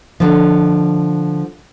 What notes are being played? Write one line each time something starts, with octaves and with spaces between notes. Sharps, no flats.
D3 F3